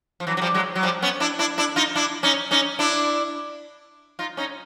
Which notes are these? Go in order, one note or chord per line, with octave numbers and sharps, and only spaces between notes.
F3
E3 F#3
F#3
F3 G3
F#3 G#3
F#3
F3 G3
B3 C#4
D4 E4
D4 E4
D4 E4
D#4 F4
D4 E4
C#4 D#4
C#4 D#4
D4 E4
D#4 F4
C#4 D#4